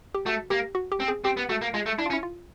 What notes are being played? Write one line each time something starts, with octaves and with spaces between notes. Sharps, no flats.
G4
A3 F#4
A#3 G4
F#4
G4
C4
G#4
C4 G4
B3
A3 F#4
A#3
G#3 F4
A3
D4 E4
F4
C#4
E4
F4